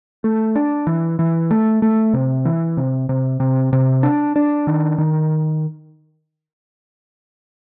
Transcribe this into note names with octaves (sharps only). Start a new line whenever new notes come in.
A3
D4
E3
E3
A3
A3
C3
E3
C3
C3
C3
C3
D4
D4
D#3
D#3